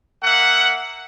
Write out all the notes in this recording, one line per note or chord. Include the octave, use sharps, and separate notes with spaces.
A#3 E5 F#5